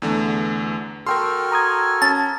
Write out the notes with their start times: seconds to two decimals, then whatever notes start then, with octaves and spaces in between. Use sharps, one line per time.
0.02 E2 D3 A3
1.07 F#4 A4 A#4 G5 C6 F6
1.52 A#5 D#6 G#6
2.02 C#4 A5